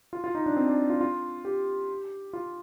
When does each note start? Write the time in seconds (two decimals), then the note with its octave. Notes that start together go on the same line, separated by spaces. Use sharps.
0.13 F4
0.24 F4
0.35 D#4
0.46 D4
0.57 C4
0.67 D4
0.90 F4
1.01 F4
1.45 G4
2.33 F4